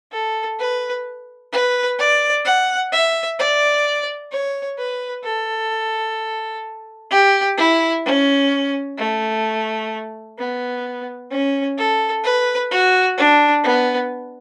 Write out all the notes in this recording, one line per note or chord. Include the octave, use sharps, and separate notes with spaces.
A4
B4
B4
D5
F#5
E5
D5
C#5
B4
A4
G4
E4
C#4
A3
B3
C#4
A4
B4
F#4
D4
B3